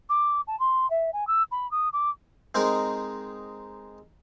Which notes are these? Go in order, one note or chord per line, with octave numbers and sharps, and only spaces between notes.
D6
A5
C6
E5
G#5
E6
B5
D#6
D6
G#3 C4 D#4 A#4